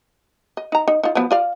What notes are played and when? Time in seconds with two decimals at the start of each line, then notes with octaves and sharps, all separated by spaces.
0.57 D#5
0.72 D#4 A#5
0.88 D#4
1.03 D#4 F4
1.15 F3 F#3 B3
1.31 F4 D5 F5